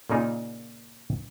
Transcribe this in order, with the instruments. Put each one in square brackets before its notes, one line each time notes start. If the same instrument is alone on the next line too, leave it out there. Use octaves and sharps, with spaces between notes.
[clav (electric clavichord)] A#2 C#3 A#3 D#4 F4